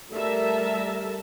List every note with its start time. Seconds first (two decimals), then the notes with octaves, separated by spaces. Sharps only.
0.11 G3 A3 A#4 E5 A5